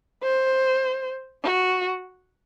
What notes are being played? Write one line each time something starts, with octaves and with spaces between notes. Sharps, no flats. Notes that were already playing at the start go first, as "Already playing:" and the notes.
C5
F#4